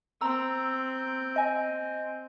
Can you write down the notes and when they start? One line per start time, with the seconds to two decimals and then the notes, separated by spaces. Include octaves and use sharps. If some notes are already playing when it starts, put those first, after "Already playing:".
0.21 C4 A#5 E6
1.36 D#5 G#5